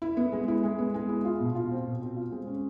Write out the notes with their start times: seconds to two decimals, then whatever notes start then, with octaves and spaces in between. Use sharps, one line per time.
0.02 E4
0.17 B3
0.32 G#3
0.48 E4
0.63 G#3
0.78 B3
0.94 G#3
1.09 E4
1.25 F4
1.40 B2
1.55 F4
1.71 C4
1.86 B2
2.01 C4
2.17 F4
2.32 G#3
2.47 C#4